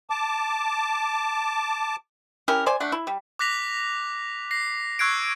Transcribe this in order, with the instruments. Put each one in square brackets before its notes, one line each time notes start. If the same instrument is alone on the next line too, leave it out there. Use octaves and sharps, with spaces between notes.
[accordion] A5 D6
[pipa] C#4 E4 G4 A#4
C5 D5 G#5
A3 D4 F#5
E4
G3
[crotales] D6 F#6 A#6 B6 F7
A#6 C7
C#6 E6 F#6 G#6 C7 D7